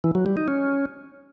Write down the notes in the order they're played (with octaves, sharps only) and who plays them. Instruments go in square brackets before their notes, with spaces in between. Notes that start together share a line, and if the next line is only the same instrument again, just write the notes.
[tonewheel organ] E3
F#3
G3
D#4
C#4